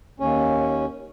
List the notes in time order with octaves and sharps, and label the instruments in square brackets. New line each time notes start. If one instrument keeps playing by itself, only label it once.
[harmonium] D#2 C#4